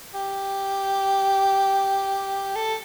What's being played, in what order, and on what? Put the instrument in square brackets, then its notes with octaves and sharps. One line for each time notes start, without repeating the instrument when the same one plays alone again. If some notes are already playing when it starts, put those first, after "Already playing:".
[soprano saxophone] G4
A4